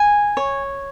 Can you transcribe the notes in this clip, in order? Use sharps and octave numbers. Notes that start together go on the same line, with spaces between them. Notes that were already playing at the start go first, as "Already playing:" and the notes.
Already playing: G#5
C#5